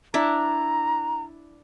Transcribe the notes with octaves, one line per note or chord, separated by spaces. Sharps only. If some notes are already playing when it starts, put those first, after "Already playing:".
D4 E4 A#5